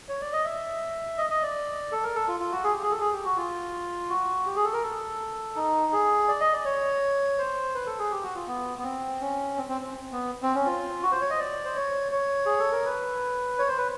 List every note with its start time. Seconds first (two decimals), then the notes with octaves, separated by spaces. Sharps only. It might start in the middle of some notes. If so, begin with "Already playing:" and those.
0.08 C#5
0.21 D5
0.33 D#5
0.45 E5
1.18 D#5
1.30 D#5
1.42 D5
1.92 A4
2.04 A#4
2.16 A4
2.28 F4
2.40 F4
2.52 F#4
2.64 G#4
2.73 G4
2.83 G#4
2.92 A4
3.00 G#4
3.12 G4
3.25 F#4
3.37 F4
4.10 F#4
4.46 G4
4.56 G#4
4.64 A4
4.73 A#4
4.83 A4
5.56 D#4
5.93 G#4
6.28 D5
6.41 D#5
6.53 D5
6.65 C#5
7.38 C5
7.75 B4
7.86 A4
7.99 G#4
8.11 G4
8.23 F#4
8.35 F4
8.47 B3
8.78 B3
8.83 C4
9.20 C#4
9.57 C4
9.69 C4
9.81 C4
10.12 B3
10.42 C4
10.55 C#4
10.66 F4
11.02 F#4
11.12 C5
11.21 C#5
11.30 D#5
11.39 D5
11.65 C5
11.76 C#5
12.12 C#5
12.46 G#4
12.59 A4
12.72 A#4
12.85 B4
13.58 C#5
13.68 C5
13.78 B4